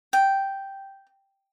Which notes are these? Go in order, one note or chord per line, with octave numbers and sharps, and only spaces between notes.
G5